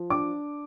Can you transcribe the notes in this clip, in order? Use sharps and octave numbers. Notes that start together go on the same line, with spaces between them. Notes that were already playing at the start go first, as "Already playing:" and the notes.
Already playing: F3
D4 D6